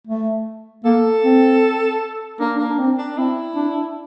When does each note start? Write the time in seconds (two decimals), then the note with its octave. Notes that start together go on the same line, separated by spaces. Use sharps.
0.07 A3
0.84 A#3 A4
1.24 C4
2.40 A#3 D4
2.56 D4
2.59 A#3
2.69 D4
2.79 C4
2.98 D4
3.17 C4 E4
3.56 D4